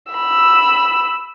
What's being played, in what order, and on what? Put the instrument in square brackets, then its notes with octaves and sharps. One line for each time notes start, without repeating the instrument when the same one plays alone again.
[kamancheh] B5 E6